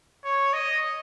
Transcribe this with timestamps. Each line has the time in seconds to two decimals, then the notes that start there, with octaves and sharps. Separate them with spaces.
0.24 C#5
0.53 D#5